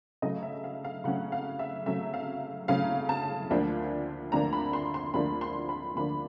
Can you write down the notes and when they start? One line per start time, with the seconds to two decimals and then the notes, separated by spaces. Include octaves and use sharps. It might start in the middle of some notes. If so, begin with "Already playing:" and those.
0.22 C#3 F#3 A3 C#4 D#5
0.43 E5
0.64 F5
0.84 F5
1.04 C#3 F#3 A3 C#4 F#5
1.32 F5
1.59 E5
1.86 C#3 F#3 A3 C#4 E5
2.14 F5
2.68 C#3 F#3 A3 C#4 F5
3.09 A5
3.50 D2 D3 F3 A#3 D4
4.32 D2 D3 F3 A#3 D4 A#5
4.53 B5
4.73 C6
4.94 C6
5.14 D2 D3 F3 A#3 D4 B5
5.41 C6
5.69 B5
5.96 D2 D3 F3 A#3 D4 B5